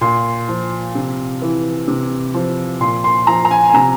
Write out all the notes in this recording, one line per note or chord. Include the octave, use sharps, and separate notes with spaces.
A#2 C6
F3
C3
E3
C3
F3
A#2 C6
C6
F3 A#5
A#5
G#5
G#5
C3 A#5